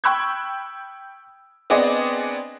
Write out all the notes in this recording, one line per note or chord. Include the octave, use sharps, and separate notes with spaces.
G5 B5 C#6 E6 F#6 G#6
B3 C4 D4 G#4 D5 D#5